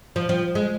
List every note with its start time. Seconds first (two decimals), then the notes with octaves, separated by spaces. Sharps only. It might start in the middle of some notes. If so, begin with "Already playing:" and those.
0.16 F3
0.29 F3
0.55 G#3